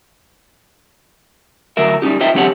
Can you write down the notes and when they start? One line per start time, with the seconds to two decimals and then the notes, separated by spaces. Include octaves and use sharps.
1.77 D2 F#3 A#4 E5
2.02 G3 C#4 D#4 G4
2.20 F4 C5 D#5 E5 G5
2.34 D3 F#3 C4 G4 C#5 F#5